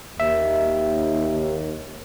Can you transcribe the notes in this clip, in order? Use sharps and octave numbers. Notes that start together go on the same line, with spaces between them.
D#2 E5